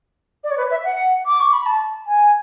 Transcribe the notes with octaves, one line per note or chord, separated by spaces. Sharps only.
D5
C#5
B4
E5
F#5
D6
C#6
B5
A5
G#5